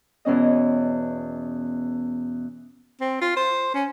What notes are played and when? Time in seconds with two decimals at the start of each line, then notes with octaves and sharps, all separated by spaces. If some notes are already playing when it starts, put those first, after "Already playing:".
0.25 E2 B2 C#4 D#5
3.01 C4
3.21 F4
3.37 C5
3.74 C#4